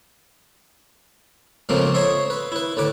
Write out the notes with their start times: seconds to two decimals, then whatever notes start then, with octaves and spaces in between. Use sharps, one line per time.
1.69 G#2 C#3 F3 A3 A#3 C4
1.94 C#5 D#5 E5 C6
2.30 B4
2.52 E4 B4
2.77 D2 A2 B4 D6